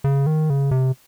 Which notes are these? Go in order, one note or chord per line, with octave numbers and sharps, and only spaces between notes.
C#3
D#3
C#3
C3